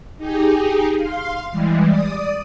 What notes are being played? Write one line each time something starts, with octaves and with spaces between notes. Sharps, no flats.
D#4 G4 G#4
F5 C6
E3 G3 G#3
D5 D#6